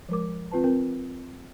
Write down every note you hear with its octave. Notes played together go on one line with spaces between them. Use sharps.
F3 G#3 A#4 D6
C4 F4 B4 A5
C4 A#4